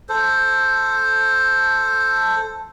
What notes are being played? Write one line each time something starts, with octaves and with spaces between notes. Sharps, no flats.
A4 C5